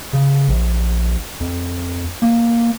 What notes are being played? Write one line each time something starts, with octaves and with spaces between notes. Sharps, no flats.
C#3
A#1
F2
A#3